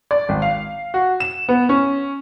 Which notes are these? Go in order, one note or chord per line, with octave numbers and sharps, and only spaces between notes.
D5
G#1
F5
F#4
E7
B3
C#4